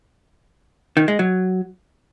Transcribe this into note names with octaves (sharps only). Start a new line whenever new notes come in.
D#3
G#3
F#3